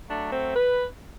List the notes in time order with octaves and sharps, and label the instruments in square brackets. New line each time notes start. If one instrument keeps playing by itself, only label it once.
[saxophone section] F#3 A3 D4
C4
B4